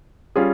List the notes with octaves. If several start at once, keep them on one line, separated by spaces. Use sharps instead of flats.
G3 C#4 F4 G#4